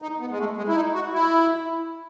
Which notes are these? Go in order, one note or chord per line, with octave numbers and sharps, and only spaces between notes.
D#4
B3
G#3
A3
G#3
E4
D#4
F#4
E4